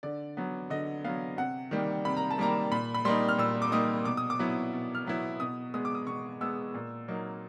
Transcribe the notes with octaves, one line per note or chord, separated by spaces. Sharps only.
D3 D5
F#3 B3
D3 D#5
F#3 B3 F5
C3 F#5
D#3 G3 A#3
C3 B5
A#5
A5
D#3 G3 A#3 A#5
A#2 B5
B5
G3 A#3 D#4 C6
F6
A#2 E6
D6
G3 A#3 D#4 D#6
B2 D6
D#6
D6
F#3 B3 E4
B2
F6
F#3 B3 E4
B2 D#6
G#3 B3 D#6
D6
D#6
B2 C#6
G#3 B3 E6
A#2
F#3 A#3 D#4